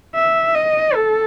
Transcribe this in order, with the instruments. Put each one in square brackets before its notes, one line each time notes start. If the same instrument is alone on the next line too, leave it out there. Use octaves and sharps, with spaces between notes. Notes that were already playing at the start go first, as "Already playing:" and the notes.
[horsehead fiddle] E5
D#5
A4